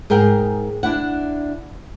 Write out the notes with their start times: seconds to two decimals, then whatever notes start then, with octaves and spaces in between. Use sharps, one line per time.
0.10 G#2 G#4 A#4 G5
0.83 D4 E4 F#5